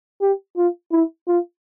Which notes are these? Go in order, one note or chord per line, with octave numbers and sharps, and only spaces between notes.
G4
F4
E4
F4